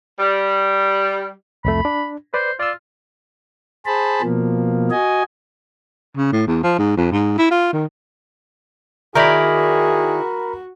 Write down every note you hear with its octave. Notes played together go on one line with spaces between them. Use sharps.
G3
C2 F2 A3 B5
D4
B4 C5 D5
F4 D5 E6
G#4 C5 A5 B5
B2 F3 A#3
F#4 D#5 G#5
C#3
A2
E2
F3
G#2
F2
G#2
E4
F4
D#3
D#3 E4 F#4 G#4 A#4 D5 A#5 B5